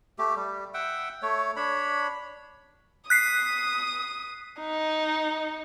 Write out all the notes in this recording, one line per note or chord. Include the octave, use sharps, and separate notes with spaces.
A3 G4
G3
E5 F#5 G5
A3 C#5
D4 C#5 B5
D#6 F#6 B6 C7
D#4